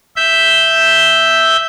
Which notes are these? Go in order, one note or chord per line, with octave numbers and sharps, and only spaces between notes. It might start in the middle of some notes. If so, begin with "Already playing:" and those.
E5 G6